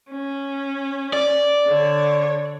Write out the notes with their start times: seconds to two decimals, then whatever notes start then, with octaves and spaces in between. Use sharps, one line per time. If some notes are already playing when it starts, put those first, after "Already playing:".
0.10 C#4
1.13 D5
1.67 D3 C#5